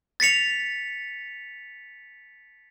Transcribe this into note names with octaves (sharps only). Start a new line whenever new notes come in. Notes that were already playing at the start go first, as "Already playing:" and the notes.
A6 B6 C#7 F7